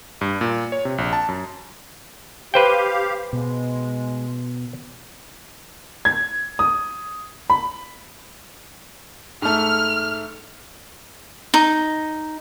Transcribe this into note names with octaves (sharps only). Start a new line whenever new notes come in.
G2
A#2
C#5
C3
A#1
A5
F#2
G4 B4 C5 F5 G5
B2 G#3
G#6
D#6
B5
G#2 A3 F6
D#4